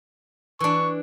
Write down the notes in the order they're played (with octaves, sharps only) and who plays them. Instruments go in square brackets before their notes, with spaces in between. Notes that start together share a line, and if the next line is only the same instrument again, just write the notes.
[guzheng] E3 D4 [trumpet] C#6